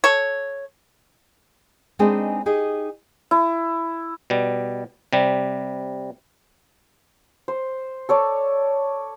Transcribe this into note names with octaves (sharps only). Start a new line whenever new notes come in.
A4 C#5
G#3 B3 C4 D4 D#4 G#4
D#4 G4 G#4
E4
B2 G3
C3 G3
C5
A4 C#5 D5